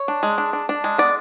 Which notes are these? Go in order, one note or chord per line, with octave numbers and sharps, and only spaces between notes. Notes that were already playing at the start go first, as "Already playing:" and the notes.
Already playing: C#5
D4
G#3
D4
D4
D4
G#3
B3 D5